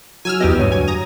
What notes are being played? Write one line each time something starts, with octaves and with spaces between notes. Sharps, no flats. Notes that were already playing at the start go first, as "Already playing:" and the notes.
F#3 G#5 E6 F6
E2 B3 G4 D#5
D2 G2 F#3 C#5 D#7
G#5
A#5 D#6